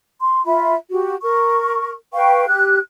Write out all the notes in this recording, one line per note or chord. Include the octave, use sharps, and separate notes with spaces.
C6
F4 E5 B5
F#4 G4
A#4 C#6
B4 F5 G5 C#6
G4 F#6